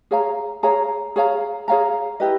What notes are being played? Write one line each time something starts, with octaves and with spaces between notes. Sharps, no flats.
G#4 C#5 F5 A#5
G#4 C#5 F5 A#5
G#4 C#5 F5 A#5
G#4 C#5 F5 A#5
E4 G4 B4 D#5